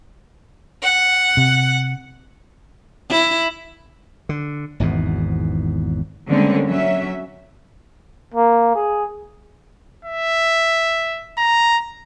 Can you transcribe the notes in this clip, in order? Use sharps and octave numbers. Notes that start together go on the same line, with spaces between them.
F#5
C3
E4
D3
G#1 E2 G#2 B2
D3 G3 G#3 A#3 C4 C#4
F#3 C#4 E5
A#3
G#4
E5
A#5